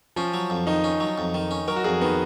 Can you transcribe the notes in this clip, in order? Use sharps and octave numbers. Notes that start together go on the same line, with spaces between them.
F3 C#4
F#3
F2
D#3 D#4
C#4
F#3
F2
D#3
C#4
F#3 A#4
F#4
F2 G#4
D#3 B3